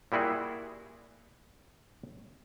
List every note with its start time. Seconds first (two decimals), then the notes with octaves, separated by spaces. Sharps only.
0.12 A#2 G3 E4 F#4 G#4